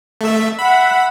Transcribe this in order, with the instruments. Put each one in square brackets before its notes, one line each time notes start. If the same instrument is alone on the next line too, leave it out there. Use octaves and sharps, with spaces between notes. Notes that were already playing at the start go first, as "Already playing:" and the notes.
[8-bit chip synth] A3 E5
[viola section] E5 F#5 [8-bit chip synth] B5